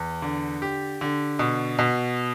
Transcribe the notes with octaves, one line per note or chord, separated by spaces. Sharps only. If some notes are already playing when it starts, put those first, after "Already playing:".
Already playing: E2
D3
G4
D3
B2
B2